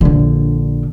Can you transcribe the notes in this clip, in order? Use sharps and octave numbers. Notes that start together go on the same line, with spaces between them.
A#1 D3